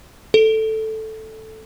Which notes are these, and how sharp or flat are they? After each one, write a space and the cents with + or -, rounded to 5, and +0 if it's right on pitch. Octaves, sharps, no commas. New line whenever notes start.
A4 +0